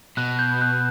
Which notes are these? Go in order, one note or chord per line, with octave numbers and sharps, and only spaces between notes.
B2 F#6
G6
F#6